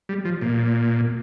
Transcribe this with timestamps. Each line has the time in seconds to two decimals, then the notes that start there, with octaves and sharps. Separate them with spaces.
0.09 G3
0.25 F3
0.41 A#2